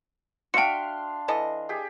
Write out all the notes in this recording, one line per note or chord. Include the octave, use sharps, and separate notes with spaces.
D4 F#4 E5 F5 G5 C6 C#7
E3 A4 D#5
G4 G#4